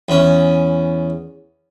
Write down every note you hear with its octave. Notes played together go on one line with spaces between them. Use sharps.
E2 C#4